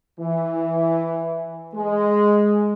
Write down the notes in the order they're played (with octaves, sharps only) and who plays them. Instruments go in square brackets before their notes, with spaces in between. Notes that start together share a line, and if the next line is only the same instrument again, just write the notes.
[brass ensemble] E3
G#3